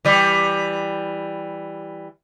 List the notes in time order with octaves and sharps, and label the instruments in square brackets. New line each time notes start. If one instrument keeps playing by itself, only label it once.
[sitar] E3 G3